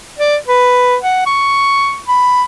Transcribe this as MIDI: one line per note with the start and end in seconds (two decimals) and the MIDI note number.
0.19 0.37 74
0.48 0.97 71
1.02 1.23 78
1.27 1.99 85
2.08 2.43 83